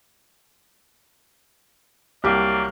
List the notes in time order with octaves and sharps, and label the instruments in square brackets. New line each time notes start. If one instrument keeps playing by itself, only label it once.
[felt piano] C2 G4 [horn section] F#3 A#3 D5